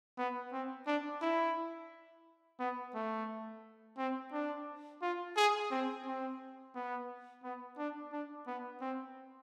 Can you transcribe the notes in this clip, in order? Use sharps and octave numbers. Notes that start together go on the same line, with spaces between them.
B3
C4
D4
E4
B3
A3
C4
D4
F4
G#4
C4
C4
B3
B3
D4
D4
B3
C4